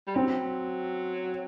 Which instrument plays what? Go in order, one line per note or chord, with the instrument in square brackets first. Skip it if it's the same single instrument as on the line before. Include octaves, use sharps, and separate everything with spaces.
[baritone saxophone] G3
[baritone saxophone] F#3 [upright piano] C4